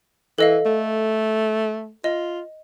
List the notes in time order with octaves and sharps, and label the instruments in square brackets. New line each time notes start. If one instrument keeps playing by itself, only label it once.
[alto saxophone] E3 [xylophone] A4 D#5 F5
[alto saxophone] A3
[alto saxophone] F4 [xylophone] D#5